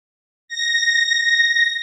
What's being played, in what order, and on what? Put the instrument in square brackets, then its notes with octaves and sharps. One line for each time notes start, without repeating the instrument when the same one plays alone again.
[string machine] A#6